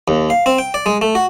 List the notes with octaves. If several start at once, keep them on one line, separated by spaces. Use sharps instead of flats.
D#2
F5
C4
G5
D5
G#3
A3
F#4